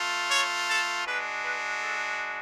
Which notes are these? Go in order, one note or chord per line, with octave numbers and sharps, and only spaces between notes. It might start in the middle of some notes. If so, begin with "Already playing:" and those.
Already playing: A3 F4
C#5
A4
G#3 D4 F#4 B4
B4
A4